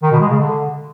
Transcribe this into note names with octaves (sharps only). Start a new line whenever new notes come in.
D#3
B2
G#3
C#3
D3